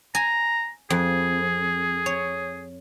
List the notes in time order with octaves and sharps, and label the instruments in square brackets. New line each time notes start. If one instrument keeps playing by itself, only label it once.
[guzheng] G#5 [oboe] A#5
[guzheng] F2 [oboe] G#4
[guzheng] C#5